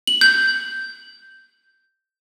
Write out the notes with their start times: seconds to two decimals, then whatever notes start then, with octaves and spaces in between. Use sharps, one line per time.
0.07 F#7
0.21 G6